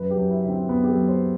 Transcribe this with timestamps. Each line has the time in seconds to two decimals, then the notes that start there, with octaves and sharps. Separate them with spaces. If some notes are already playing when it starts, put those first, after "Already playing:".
Already playing: F#2 B4
0.11 G4
0.17 F#2
0.30 E4
0.43 D3
0.49 C4
0.69 F#2 B3
0.84 G4
0.90 A4
0.95 F#3
1.09 C5